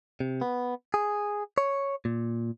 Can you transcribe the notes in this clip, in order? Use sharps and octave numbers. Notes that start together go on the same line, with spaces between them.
C3
B3
G#4
C#5
A#2